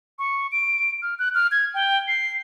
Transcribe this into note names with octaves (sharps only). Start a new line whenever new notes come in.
C#6
D7
F6
F#6
F6
G#6
G5
C7